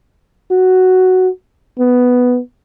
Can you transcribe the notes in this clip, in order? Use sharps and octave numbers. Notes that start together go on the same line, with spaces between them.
F#4
B3